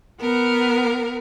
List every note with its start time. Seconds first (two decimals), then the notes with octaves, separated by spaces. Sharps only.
0.21 B3 A#4